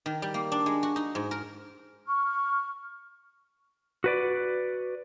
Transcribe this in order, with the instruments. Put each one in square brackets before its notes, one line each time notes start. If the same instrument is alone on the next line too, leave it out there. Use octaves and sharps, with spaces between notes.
[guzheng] D#3
G3
A#3
D4
G#3
F#4
D#4
G#2
A#4
[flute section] C#6 F6
[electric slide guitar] F#4 B4 D5